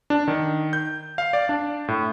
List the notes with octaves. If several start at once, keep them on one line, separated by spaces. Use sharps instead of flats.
D4
D#3
G6
F5
D5
D4
A2